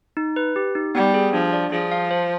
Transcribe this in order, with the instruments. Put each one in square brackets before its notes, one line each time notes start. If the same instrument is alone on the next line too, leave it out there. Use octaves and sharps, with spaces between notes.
[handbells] D#4
B4
G4
D#4
[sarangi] G3 [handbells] B3
[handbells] G#4
[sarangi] F3 [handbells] D4
[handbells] D5
[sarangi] F3 [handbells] G#4
[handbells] F5
C5